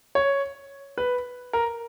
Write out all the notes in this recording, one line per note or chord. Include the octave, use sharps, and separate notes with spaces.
C#5
B4
A#4